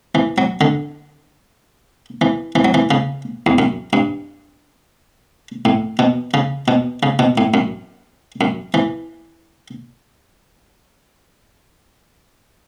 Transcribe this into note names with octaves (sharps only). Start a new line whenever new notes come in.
E3
F#3
D3
E3
E3
F#3
E3
C#3
E2
F#2
G2
A2
B2
C#3
B2
C#3
B2
A2
F#2
F#2
E3